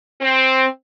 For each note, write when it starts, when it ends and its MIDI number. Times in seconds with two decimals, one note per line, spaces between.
0.21 0.66 60